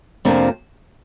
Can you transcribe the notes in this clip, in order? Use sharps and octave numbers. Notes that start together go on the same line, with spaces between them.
F2 C3 F3 A#3 D4